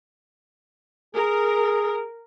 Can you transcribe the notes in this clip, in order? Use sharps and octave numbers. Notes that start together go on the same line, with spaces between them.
G#4 A#4